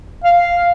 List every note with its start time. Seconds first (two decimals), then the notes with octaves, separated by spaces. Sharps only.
0.24 F5